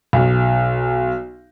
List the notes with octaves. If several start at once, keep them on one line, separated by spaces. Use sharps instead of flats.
B1